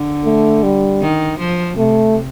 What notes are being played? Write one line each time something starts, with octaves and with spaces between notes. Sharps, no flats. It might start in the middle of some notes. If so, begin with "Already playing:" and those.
Already playing: D3
A3
G3
D#3
F3
C3 A3